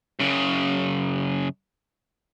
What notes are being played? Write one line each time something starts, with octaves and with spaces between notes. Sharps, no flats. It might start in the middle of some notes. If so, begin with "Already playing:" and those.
F#2 C#3